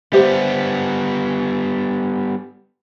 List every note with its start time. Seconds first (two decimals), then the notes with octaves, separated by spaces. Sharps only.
0.13 G3 B3 G4 C5 E5